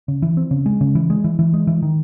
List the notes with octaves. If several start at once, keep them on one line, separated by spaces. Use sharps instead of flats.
C#3
E3
C4
C#3
G#3
C#3
E3
G#3
E3
E3
G#3
E3
D#3